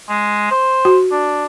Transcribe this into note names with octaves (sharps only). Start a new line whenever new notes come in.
G#3
C5
F#4
D4